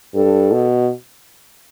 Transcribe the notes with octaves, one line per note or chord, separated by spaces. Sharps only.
G2 A4
B2